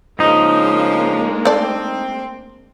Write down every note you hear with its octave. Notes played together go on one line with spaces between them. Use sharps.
C#3 F3 G#3 A#3 D4 D#4
A3 C4 D5